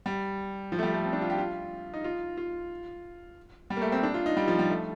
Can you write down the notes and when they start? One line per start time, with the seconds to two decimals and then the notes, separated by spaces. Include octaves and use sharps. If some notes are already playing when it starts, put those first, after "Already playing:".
0.06 G3
0.72 F3
0.79 A3
0.83 G3
0.94 A3
1.05 C4
1.13 D4
1.21 F4
1.30 G4
1.38 F4
1.94 D#4
2.04 F4
2.37 F4
3.70 G3
3.77 A#3
3.81 A3
3.92 C4
4.03 D4
4.14 F4
4.26 D#4
4.37 G3
4.48 F3
4.59 G3
4.70 A3